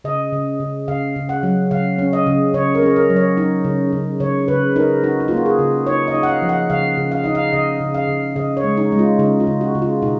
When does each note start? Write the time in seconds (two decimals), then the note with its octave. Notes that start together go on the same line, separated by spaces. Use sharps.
0.04 C#3 D#5
0.33 C#3
0.60 C#3
0.88 C#3 F5
1.16 C#3
1.29 F#5
1.43 F#3
1.71 C#3 F5
1.98 C#4
2.13 D#5
2.27 C#3
2.54 C#3 C#5
2.75 A#4
2.82 C#4 G#4
2.96 A#4
3.10 F#3
3.16 C#5
3.37 D#4
3.64 C#3
3.93 C#3
4.20 C#3 C#5
4.48 C#3 B4
4.76 D#4 A#4
5.03 D#4 F#4
5.20 D#4
5.28 A#3 F4
5.37 F#4
5.46 G#4
5.59 C#3
5.87 D#4 C#5
6.08 D#5
6.15 D#4
6.23 F#5
6.28 F5
6.42 F3
6.49 F#5
6.70 C#3 F5
6.97 C#3
7.12 F5
7.24 D#4 D#5
7.35 F5
7.53 C#3 D#5
7.81 C#3
7.94 F5
8.08 C#3
8.36 C#3 D#5
8.57 C#5
8.64 G#3
8.77 D#4
8.92 G#3
8.99 F4
9.19 C#3 D#4
9.40 F4
9.47 C#3
9.61 F#4
9.75 C#3
9.82 F4
10.02 B2 D#4